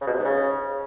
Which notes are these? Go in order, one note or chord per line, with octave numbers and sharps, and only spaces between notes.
C#3
B2
C3
G#2
C#3